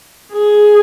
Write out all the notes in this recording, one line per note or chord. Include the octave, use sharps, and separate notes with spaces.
G#4